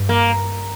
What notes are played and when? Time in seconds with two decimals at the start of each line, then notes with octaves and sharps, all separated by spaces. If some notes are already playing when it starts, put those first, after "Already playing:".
Already playing: G2
0.09 A#3